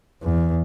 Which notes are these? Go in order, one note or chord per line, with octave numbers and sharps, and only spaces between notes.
E2